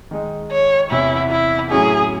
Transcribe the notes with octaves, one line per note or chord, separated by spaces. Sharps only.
D#3 G#3 D#4
C#5
E2 C3 E3 E4
E4
A2 F#3 C#4 E4 G#4